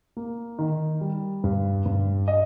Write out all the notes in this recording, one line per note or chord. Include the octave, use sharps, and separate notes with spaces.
A#3
D#3
G3
G2
G2
D#5